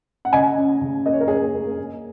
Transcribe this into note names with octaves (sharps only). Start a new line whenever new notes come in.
F#5
C#3 D#5 G#5
C#4
C#3
A#3 D#5
C#5
A#4
A#3 G#4 C#5
A#3
A#3